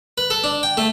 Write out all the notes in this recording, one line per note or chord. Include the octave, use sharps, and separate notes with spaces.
B4
A4
D4
G5
A3